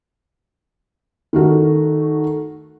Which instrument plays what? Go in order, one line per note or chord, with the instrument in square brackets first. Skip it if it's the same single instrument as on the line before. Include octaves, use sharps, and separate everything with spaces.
[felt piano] D#3 A3 F#4